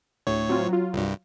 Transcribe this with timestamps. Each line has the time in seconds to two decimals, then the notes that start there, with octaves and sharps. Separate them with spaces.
0.27 D2 A2 C#5
0.49 F#3 C4 F4
0.69 F#3 F4
0.93 C2 G2